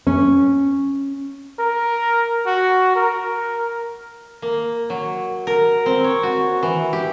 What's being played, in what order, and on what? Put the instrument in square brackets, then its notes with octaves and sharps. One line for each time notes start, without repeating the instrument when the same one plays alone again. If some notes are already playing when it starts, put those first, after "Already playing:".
[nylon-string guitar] C#4
[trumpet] A#4
F#4
A#4
[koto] A#3
F#3
A#4
C4
C#5
F#4
E3
G4